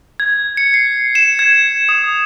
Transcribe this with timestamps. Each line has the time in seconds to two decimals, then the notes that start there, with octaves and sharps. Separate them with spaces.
0.20 G#6
0.57 C#7
0.74 C7
1.15 E7
1.39 G#6
1.89 D#6